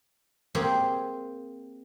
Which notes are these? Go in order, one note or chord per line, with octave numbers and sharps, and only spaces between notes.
A#3 C4 G4 G#4